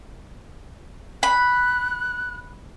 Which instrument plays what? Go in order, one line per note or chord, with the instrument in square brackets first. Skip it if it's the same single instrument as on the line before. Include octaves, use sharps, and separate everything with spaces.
[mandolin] B5 [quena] F#6